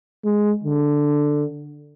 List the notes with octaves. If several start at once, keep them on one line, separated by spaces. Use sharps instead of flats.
G#3
D3